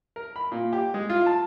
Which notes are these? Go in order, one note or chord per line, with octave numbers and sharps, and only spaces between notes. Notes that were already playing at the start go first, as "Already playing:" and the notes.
A#4
B5
A#2
G4
G#3
F4
A5